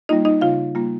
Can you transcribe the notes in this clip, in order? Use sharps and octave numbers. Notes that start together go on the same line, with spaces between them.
G3 A#3 D#4 F4 D#5
D#4 D#5
C#3 F4 F5
G3 A#3 F4